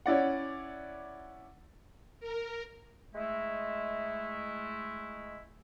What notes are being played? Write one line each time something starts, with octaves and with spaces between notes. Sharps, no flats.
C#4 E4 D5 F#5
A#4
G#3 A3 E4